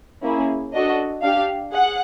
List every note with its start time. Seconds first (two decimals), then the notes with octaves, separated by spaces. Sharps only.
0.23 A#3 C#4 E4 G#4
0.74 D4 F#4 A4 D#5
1.23 D4 G4 F5
1.73 G#4 F#5